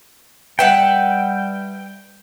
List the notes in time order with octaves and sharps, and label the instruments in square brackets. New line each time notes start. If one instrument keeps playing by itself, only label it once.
[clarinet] G3 [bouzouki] B4 E5 F#5 [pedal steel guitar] G5